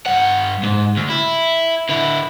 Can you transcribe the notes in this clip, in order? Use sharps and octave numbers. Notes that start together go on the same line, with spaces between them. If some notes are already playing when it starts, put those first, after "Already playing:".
G2 F#5
G#2
D2
E4
D3 E4